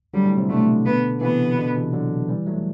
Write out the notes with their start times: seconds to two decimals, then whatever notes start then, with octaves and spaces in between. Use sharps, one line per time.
0.14 D3 F#3 G3
0.25 A2
0.37 A2 C3
0.49 B2 D3 A3
0.85 B3
1.21 C3 E3 B3
1.56 B2 D3
1.75 C3 E3
1.93 D3 F#3
2.29 E3 G3
2.47 F#3 A3